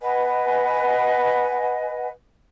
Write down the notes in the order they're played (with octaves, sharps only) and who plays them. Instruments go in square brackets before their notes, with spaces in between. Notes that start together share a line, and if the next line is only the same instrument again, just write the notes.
[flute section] B4 D#5 F#5 G#5